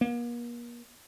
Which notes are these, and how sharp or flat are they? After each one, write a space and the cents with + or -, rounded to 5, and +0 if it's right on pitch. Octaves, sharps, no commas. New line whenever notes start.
A#3 +40